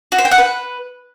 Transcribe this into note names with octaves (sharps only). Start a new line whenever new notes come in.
F#4
C5
G5
F#5
B4